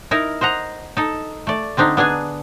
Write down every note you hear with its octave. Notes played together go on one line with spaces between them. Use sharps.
D#4 E4 A#4
C5 D#5 F#5 A#5
D#4 A4
A3 D5
D3 C4 D4 D#4
B3 D4 G#4 G#5